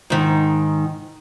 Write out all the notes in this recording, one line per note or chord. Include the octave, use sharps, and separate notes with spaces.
G#2 D#3